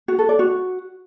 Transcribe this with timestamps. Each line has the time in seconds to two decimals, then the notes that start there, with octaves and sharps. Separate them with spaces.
0.08 F#4
0.19 A4
0.29 D5
0.39 F#4